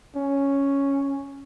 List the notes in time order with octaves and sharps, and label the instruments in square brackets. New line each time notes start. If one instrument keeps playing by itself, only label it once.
[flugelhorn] C#4